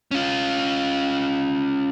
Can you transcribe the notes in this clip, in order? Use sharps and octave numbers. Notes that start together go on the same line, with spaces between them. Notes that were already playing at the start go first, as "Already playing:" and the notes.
C#4 F4